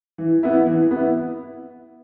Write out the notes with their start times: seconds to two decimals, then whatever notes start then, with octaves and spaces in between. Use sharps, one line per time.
0.18 E3
0.43 B3 E4
0.67 E3
0.91 B3 E4